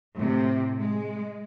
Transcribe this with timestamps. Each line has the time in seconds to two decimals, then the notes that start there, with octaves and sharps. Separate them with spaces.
0.16 A2 C3
0.80 G#3